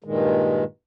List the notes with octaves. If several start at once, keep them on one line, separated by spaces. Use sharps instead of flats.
G2 A#2 D#3 G#3